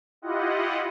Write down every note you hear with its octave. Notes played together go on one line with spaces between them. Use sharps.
E4 F4 G4 D#5 F#5